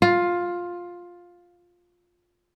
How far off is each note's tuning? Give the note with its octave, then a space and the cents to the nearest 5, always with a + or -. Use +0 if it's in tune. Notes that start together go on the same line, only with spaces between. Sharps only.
F4 +10